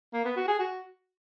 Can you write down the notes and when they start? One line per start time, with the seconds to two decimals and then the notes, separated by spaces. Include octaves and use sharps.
0.14 A#3
0.25 B3
0.36 F#4
0.48 G#4
0.59 F#4